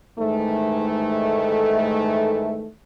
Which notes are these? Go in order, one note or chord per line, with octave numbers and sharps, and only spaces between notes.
G#2 D#3 E3 A3